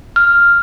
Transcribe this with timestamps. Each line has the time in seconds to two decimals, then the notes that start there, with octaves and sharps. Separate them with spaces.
0.16 F6